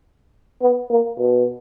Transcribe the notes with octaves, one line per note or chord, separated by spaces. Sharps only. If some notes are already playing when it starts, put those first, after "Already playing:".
B3
A#3
B2